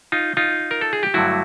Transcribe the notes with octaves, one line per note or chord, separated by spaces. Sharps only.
D#4 F4
D#4 F4
A#4
A4
G#4
G4
G2 D3 F#3 A3 E4 F#4